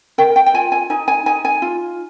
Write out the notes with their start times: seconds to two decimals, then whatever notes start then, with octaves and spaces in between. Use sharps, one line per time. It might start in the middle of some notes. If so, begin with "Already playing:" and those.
0.18 A#4 G5
0.36 G5
0.46 G5
0.54 F4 G#5
0.72 G#5
0.90 D#4 G#5
1.08 G#5
1.26 D#4 G#5
1.45 G#5
1.62 F4